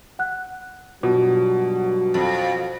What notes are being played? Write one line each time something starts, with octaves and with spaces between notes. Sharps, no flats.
F#5 F#6
G2 B2 F#3 F4 F#4
F2